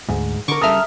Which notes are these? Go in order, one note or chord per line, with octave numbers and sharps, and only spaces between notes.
D2 G#2
D3 A#4 C#6 D6
C#3 G3 A4 A#4 E5 D#6 F6